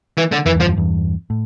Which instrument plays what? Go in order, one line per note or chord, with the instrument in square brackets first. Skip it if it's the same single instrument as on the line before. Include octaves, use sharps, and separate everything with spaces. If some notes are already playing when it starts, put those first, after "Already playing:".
[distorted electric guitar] E3
D3
[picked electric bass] F2 [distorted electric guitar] E3
[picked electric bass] E2 G2
[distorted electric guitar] F3
[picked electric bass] E2 G2
E2 G2
A2